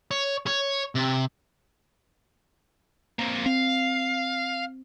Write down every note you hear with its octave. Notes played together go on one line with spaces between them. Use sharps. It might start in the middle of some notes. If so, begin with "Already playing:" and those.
C#5
C#5
C3
A#3 C4
C4 F5